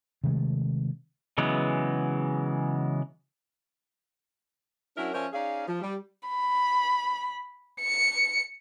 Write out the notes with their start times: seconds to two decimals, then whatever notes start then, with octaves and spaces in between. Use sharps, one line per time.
0.24 C3 D#3 G#3 A3
1.38 C#3 E3 F#3 G#3 B3
4.96 F#3 C#4 D4 E4 A#4
5.13 F3 C#4 A#4 C5 D5 E5
5.33 C#4 D#4 G#4 D5 F5
5.67 F3
5.81 G3
6.29 B5
7.81 C#7